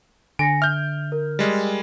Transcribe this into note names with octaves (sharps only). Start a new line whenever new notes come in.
D3 G#5 A#6 C#7 D7
E5 F6 G6
A#4
G3 G#3